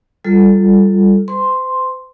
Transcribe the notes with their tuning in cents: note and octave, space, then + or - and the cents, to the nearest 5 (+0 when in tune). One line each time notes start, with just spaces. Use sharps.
G3 +0 F4 +0 A4 +0
C5 -40 C6 +0